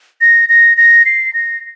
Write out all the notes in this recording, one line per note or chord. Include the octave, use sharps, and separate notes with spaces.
A#6
A#6
A#6
C7
A#6